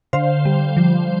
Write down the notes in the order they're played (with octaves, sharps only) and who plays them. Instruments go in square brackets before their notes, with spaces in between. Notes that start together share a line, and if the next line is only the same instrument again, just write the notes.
[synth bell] D3 C5 F5
G3
F3